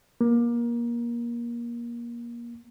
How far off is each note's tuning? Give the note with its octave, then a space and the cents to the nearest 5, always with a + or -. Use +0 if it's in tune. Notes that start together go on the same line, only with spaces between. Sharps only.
A#3 +25